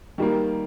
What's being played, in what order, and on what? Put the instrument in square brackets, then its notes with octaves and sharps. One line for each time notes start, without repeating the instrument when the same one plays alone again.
[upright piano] D#3 G3 A#3